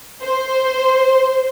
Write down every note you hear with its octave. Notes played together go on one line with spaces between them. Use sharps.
C5